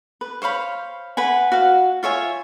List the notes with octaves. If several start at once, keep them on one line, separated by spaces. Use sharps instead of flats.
B4
C5 C#5 F5 B5
B4 F#5 G#5
F#4 F5
F4 C#5 E5 G#5